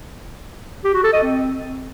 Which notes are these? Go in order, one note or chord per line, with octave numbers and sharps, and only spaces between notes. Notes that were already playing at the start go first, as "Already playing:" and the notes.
G4
F#4
A4
D#5
C4